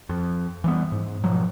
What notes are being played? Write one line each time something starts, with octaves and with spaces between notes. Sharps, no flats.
F2
E3 G3 B3
G#2
B2 F3 F#3